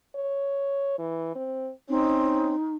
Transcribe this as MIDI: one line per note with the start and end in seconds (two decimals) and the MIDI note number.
0.15 0.96 73
0.99 1.33 52
1.35 1.70 60
1.89 2.55 60
1.89 2.54 61
1.89 2.75 63